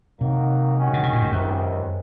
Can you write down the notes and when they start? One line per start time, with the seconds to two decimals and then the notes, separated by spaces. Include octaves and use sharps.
0.20 C3 D#3 F#3 A#3 D#4
0.77 D#3 G#3 C#4 F#4
0.94 C#3
1.03 C3
1.13 A#2
1.22 G#2
1.32 C#2 F#2 C3 D#3